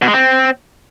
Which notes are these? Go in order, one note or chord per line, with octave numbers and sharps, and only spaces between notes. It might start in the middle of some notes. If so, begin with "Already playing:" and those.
B2
G#3
C4